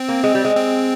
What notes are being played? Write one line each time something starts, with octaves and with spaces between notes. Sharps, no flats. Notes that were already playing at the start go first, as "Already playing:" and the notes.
Already playing: C4
A#3
G#3
G3
G#3
C4